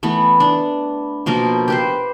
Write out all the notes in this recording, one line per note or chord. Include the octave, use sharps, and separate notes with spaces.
E3 A3 B3
D4
B2 F3 A#3 A#4
G4 B4 C5